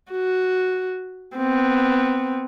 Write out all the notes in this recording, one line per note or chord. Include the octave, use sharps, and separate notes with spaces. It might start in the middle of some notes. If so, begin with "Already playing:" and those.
F#4
B3 C4